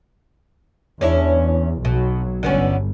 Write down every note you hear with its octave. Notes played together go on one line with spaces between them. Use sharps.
E2 C#4 D4 E4
B1 B2 F#3
G1 D3 B3 C#4